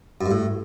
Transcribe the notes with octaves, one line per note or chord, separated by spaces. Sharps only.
F#2
G2
A2